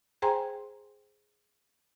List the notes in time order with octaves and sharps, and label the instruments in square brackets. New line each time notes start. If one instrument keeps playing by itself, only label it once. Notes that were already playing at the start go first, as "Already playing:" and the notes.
[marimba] G#4 C5 G5 G#5 A#5 C6